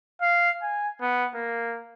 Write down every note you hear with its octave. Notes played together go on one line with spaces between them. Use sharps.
F5
G#5
B3
A#3